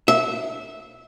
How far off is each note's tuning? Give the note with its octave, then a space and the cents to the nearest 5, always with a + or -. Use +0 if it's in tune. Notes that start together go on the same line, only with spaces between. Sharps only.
E5 -20